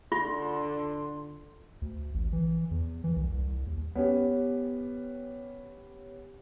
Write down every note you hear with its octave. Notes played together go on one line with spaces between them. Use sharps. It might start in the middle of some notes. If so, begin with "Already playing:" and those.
D3 F4 C6
D2
A1
E3
E2
E3
C2
C2
D#2
B3 C#4 G4